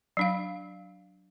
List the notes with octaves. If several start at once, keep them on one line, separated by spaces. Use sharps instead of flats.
F#3 D4 F5